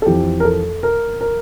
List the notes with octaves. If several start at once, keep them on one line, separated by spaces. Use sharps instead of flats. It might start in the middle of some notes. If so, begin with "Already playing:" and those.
A4
F2 E3 G4
A#4
A4
A#4
A#4